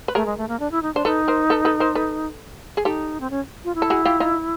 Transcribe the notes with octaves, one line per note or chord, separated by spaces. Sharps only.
B4
A3 G#4 A#4
G#3
A3
A#3
D4
E4
D#4
D4 C5
D#4 A4 B4
A#4 C5
A4 B4
A4 B4
A#4 C5
A4 B4
G#4
D#4 G4 A4
C4
C#4
F4
E4
A4
F#4 G#4
F4 G4
D#4 F4